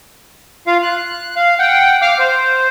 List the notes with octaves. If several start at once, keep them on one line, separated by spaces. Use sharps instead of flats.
F4 F5
F#6
F5
F#5 G5
F5 D6 F6
C5